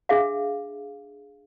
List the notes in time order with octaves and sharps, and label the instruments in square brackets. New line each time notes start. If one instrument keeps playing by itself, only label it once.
[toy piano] D4 G#4 E5 F5